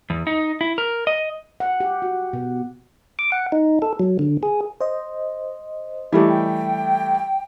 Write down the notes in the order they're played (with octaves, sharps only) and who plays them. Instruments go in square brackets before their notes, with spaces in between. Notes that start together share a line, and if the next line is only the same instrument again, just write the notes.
[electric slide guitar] E2
D#4
E4
A#4
D#5
[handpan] F#5
G4
F#4
B2
[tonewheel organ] D6
F#5
D#4
A4
F#3
D3
G#4
[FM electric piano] C5 D#5
[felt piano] E3 G3 A3 [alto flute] G4
[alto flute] G5